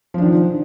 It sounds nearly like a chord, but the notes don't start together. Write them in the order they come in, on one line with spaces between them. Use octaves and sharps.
F3 D4 D#3